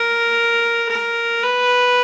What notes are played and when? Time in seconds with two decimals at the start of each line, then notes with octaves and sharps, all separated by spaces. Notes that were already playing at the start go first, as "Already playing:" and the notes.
Already playing: A#4
0.89 A#4
1.43 B4